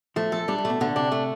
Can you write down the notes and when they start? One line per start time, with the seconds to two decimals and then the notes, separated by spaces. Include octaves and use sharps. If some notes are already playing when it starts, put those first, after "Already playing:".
0.16 F3 A3
0.32 F3 A4
0.48 G3 D4
0.58 G3
0.65 B2 A3
0.80 B2 D3
0.96 C3 D4
1.12 A3